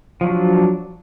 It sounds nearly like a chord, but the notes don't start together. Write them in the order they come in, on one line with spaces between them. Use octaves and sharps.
F3 F#3 D4